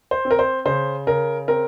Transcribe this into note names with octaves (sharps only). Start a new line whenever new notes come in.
C5
C4
A#4
C5
C#3 C5
C#3 A#4
C4 A#4